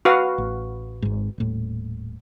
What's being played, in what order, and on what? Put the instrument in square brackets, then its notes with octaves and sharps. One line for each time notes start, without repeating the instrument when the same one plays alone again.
[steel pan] F#4 B4 F5
[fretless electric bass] A1
G#1 G#2
D#1 A2